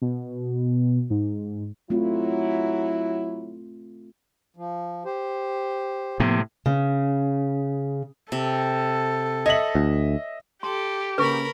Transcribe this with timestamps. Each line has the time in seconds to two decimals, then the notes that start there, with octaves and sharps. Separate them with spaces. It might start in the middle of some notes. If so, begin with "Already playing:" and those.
0.02 B2
1.10 G#2
1.90 F#3 A3 C4 E4 F4
4.57 F3
5.05 G4 C5
6.20 A2 C3 F3 A#3 B3
6.66 C#3
8.32 C3 A4
9.46 C#5 D#5 E5 F#7
9.75 D2
10.63 G4 A4 C6
11.18 C#3 A#3 A#4 B4 B5 C#6